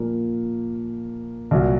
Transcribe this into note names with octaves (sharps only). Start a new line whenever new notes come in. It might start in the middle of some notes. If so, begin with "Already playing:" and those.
Already playing: A#2 F3 A#3
C2 A#2 F#3